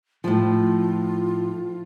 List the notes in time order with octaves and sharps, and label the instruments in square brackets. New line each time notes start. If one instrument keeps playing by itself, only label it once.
[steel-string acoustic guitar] A2 F3 [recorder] F4